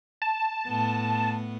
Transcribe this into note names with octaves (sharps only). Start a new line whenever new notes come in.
A5
A2 B3